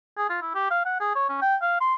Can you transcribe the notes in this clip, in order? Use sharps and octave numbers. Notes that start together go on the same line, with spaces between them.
G#4
F4
E4
G4
F5
F#5
G#4
C#5
C#4
G5
F5
C6